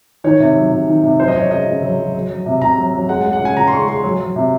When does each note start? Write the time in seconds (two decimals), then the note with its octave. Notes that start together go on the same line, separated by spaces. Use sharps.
0.24 D#3 C#5
0.40 C3
0.56 F#3
0.72 C3
0.87 D#3
1.03 C3
1.19 F#3 C5
1.28 D#5
1.35 F#3 C#5
1.51 C#3 D#5
1.67 C#3
1.82 F#3
1.99 F#3
2.14 F#3
2.30 F#3
2.46 C3
2.61 C3 A#5
2.78 F#3
2.94 F#3
3.09 G#3 F#5
3.21 F#5
3.25 G#3
3.33 F#5
3.41 C#3 G#5
3.57 C#3 A#5
3.68 C6
3.73 G#3 C#6
3.88 G#3 C6
4.04 F#3
4.20 F#3
4.36 C3